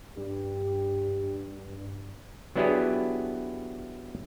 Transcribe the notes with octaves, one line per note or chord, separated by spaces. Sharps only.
G2 G4
F#3 B3 D4 E4 G4 G#4